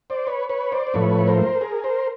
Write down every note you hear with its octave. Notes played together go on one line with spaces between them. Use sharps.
C5 D5
B4 C#5
B4 C#5
C5 D5
C5
A2 F3 A3 B4 C#5
A#4 C5
G#4 A#4
A#4 C5